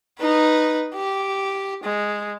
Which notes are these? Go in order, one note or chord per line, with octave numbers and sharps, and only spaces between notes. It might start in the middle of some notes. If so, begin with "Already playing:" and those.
D#4 B4
G4
G#3